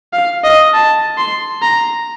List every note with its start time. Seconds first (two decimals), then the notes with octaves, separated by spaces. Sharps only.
0.13 F5
0.44 D#5
0.74 A5
1.17 C6
1.62 A#5